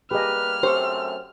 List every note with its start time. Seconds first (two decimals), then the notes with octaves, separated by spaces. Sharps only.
0.11 G3 A#3 G4 G#4 B4 D#5 F6
0.63 F#2 A3 C4 G4 C5 C#6